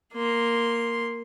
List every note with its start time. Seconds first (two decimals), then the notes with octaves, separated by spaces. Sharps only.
0.13 A#3 C6